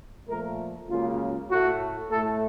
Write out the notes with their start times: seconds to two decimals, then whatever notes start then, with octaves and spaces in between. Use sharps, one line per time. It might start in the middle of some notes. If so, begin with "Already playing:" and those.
0.28 A#2 F3 A3 A#4
0.88 C#2 C#3 F#3 A#3 F4
1.49 A2 A3 F#4
2.10 A2 A3 A4